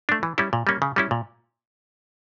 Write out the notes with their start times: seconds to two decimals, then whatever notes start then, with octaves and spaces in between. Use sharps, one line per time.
0.09 A3 D4
0.23 E3
0.38 G3 C#4 E4
0.53 A#2
0.67 G3 A#3 C#4
0.82 C#3
0.96 G3 C#4 E4
1.11 A#2